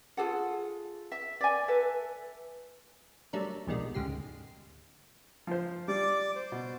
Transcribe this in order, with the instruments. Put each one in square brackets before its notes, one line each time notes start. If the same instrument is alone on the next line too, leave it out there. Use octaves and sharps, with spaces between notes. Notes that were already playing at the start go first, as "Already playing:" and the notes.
[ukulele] F4 G#4 A4 F#5
E5
D5 G#5
A4 B4 E5
[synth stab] F#3 G3 A3 D4 A#4
A#1 E2 B2 D#3 G3 G#3
D2 G#2 C#3 G4 C7
[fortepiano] F3 C5
[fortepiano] G3 [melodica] D5 D6
[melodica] C5
[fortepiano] B2